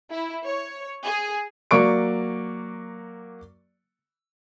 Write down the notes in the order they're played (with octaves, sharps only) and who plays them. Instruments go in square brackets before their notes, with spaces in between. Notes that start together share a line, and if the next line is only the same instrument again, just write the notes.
[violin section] E4
C#5
G#4
[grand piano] F#3 A#3 D5 C#6 D7